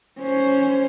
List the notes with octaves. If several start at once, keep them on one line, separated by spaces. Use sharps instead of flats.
C#4 C5